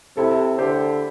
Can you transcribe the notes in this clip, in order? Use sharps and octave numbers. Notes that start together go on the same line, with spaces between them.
C3 E4 A4
D3 G4 C5